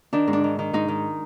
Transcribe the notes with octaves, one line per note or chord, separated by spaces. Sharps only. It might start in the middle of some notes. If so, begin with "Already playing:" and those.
D#3 D4
G#2
D4
D#3
D#3
G#2 D#4
D#3